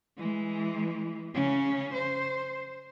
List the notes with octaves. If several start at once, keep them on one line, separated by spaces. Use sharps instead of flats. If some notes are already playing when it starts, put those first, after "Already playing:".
E3 G#3
C#3 C#4
C5